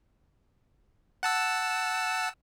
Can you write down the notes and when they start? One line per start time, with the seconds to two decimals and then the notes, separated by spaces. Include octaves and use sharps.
1.23 F#5 A5 E6